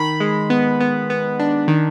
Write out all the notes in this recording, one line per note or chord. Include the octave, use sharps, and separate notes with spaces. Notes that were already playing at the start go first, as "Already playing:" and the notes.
Already playing: D#3 B5
G#3
B3
B3
B3
D4
D#3